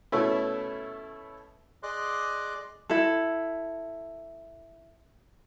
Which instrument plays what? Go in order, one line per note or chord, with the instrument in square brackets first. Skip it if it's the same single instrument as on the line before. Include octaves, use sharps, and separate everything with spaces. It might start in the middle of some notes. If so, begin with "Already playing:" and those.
[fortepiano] B2 A3 C#4 E4
[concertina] G#4 D5 D#5 C6 D6 F#6
[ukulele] E4 A4